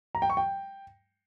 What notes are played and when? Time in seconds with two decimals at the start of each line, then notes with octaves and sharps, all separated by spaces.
0.15 A#5
0.22 G5
0.30 C#6
0.37 G5